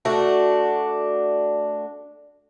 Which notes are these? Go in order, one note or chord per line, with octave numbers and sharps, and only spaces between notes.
A3 D4 F#4